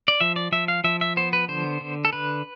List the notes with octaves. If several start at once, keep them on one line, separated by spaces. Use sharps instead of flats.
D5
F3 E5
D5
F3 E5
F5
F3 E5
E5
B3 C5
B4
D3 C5
D3
A4
D3 B4